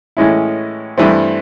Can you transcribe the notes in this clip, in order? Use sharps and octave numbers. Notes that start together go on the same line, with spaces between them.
A2 E3 G#3 C#4 E4
G2 E3 A3 C4